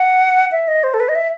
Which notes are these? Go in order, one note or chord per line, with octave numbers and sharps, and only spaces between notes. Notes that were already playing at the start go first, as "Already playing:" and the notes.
Already playing: F#5
E5
D#5
C5
A4
B4
D#5
E5